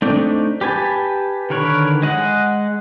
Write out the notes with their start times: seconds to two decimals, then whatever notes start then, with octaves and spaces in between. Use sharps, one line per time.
0.02 A3 C4 D4 D#4
0.61 G4 B4 G#5 A5
1.50 D3 D#3 A#4 B4 C#5
2.02 G#3 D#5 F#5